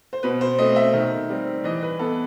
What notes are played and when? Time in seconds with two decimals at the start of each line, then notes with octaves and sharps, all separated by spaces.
0.13 C5
0.23 B2 B4
0.41 C5
0.58 A3 C4 D#5
0.76 E5
0.93 D#3
1.29 G3 C4
1.64 E3 D#5
1.83 B4
1.99 B3 A4